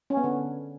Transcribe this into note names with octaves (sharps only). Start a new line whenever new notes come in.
C#4
B3
D3